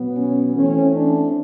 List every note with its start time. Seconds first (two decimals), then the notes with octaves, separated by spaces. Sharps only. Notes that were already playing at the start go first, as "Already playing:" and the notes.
Already playing: B2 F#3 B3
0.15 C#4
0.54 E3 A3 C4 C#4
0.93 D4